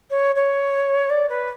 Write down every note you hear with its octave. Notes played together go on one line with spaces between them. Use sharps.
C#5
C#5
D5
B4